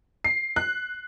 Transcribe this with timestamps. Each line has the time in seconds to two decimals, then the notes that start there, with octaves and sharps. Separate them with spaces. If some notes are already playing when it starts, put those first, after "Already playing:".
0.24 C7
0.56 F#6